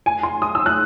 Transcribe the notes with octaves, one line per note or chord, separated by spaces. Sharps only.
G#5
C6
D#6
E6
F#6